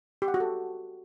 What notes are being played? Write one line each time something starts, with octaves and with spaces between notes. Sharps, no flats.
G4
F#5
F#4
A4